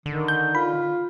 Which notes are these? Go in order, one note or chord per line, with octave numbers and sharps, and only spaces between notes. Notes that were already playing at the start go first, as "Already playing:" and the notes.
D3 D#3
G6
F4 B5